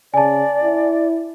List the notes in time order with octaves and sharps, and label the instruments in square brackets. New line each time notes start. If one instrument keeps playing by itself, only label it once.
[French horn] C#3 [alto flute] D5 [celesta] G#5 A5
[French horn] E4